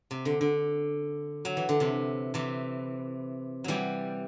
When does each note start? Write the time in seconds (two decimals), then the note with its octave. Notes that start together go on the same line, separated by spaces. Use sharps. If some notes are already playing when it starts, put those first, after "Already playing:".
0.11 C3
0.25 D3
0.41 D3
1.45 F#3
1.57 E3
1.69 D3
1.80 C3 E3
2.34 C3 E3
3.64 E3 F#3 G3